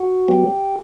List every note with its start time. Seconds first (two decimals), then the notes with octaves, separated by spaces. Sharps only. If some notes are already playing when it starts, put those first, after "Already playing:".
Already playing: F#4
0.28 F#3 B3 G4